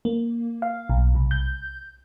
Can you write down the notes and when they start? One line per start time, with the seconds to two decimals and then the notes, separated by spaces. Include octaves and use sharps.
0.05 A#3
0.62 F5
0.89 B1
1.15 C2
1.31 G6